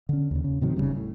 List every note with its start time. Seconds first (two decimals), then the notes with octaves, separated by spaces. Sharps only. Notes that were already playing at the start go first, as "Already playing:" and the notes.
0.09 D3 C#4
0.31 D#2 C#3
0.44 C#3
0.61 A2 C3 D#3 F#3
0.76 F1 D2 C#3 G3
0.97 A2